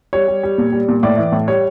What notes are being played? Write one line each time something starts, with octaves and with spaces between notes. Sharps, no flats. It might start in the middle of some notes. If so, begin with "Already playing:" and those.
G3 C#5
G3
G3
A#2
G3
A#2
A2 D5
E3
A2
G3 C#5